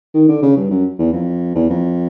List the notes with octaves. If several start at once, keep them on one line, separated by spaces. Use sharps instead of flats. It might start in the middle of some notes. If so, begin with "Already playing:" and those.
D#3
D3
C#3
G2
F#2
E2
F2
E2
F2